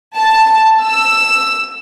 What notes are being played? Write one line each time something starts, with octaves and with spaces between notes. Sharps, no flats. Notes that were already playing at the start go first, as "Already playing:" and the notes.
A5
E6